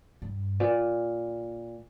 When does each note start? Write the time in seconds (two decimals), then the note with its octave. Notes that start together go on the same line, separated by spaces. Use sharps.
0.22 G2
0.60 A#2